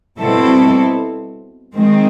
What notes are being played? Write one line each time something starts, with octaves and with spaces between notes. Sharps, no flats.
B2 G3 C4 E4 A4
D#3 G#3 C4